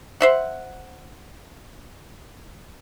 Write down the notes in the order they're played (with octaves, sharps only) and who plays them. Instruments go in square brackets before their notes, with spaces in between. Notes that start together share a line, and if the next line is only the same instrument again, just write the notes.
[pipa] C5 E5 F#5